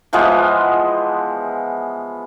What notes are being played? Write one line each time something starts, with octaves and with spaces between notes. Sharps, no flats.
E3 F3 G#3 B3